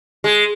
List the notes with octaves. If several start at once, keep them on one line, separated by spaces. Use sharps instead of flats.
G#3